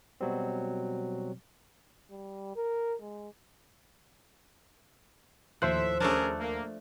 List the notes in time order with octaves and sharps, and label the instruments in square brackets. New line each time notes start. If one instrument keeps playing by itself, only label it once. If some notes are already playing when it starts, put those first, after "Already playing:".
[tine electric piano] B2 F#3 G3 C4
[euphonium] G3
A#4
G#3
[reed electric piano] D#2 C5 F#6 [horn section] A2 E5 [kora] F3
[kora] A3 D4 [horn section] C#4 G#4 A#4
[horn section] A#3